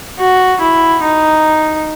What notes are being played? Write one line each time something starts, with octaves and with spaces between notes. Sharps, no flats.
F#4
E4
D#4